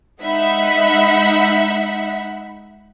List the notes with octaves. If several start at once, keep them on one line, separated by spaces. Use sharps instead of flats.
G#3 D#4 E5 F#5 B5 B6